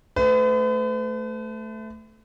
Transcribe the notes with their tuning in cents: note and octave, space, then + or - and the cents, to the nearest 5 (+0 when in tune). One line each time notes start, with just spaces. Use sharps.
A3 +0 B4 +45